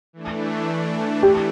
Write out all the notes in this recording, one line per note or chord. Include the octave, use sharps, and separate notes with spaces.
E3 A3 D4
G4